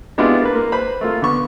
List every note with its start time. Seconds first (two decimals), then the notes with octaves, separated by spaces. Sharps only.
0.18 G#3 B3 D4 E4 F4 G4
0.42 A#3 B4
0.55 A#3
0.72 B4 C5 B5
1.01 A3 A#3 F4
1.22 D3 B3 C#6